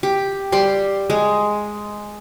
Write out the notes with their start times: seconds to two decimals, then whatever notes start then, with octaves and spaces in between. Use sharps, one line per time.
0.03 G4
0.52 G3 G4 C6
1.10 G#3